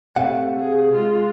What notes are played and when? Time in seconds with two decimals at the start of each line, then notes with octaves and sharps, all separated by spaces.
0.16 C3 A3 F5 F#5
0.58 G#4
0.93 G#3 F4